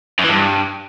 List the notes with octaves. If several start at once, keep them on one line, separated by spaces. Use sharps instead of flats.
F#2
E3
G2